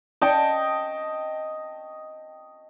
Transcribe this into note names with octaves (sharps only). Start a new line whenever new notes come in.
D#5 G5 A5 C#6